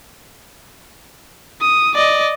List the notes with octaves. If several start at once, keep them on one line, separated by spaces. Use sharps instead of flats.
D#6
D5 D#5